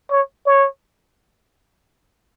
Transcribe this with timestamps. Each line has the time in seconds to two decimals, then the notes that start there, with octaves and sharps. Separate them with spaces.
0.11 C#5
0.46 C#5